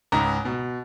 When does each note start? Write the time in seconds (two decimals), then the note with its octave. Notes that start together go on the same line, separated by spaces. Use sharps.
0.12 C#2 G#2 A#5
0.45 B2